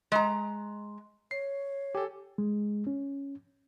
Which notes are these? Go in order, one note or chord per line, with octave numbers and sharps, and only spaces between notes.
G#3 A#5
C#5 C7
G4 A4 G#5
G#3
C#4